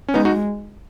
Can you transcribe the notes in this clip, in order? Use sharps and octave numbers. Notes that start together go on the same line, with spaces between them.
C#4
G#3 B3 D#4
D#4 F#4